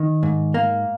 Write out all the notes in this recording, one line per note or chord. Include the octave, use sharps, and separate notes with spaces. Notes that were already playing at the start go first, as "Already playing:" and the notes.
Already playing: D#3
G#2
A#3